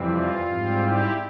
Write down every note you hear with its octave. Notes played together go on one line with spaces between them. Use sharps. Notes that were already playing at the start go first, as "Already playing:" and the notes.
Already playing: F2 C3 E3 G3 C4
F4
G#2 G3 C4
E4 G4